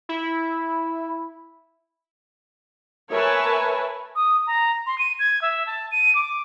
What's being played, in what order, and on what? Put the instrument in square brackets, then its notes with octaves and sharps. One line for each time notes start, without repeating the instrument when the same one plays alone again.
[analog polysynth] E4
[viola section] A#4 B4 C#5 E5 G#5 A5
[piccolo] D#6
A#5
C6
D#7
G#6
E5
A5
D#7
D6